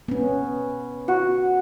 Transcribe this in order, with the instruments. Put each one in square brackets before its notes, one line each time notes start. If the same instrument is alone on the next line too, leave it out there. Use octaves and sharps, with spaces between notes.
[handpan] B3 C#4
[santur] F#4